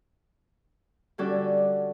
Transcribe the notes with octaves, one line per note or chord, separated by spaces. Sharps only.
D3 G3 C#4 F#4 A4 D5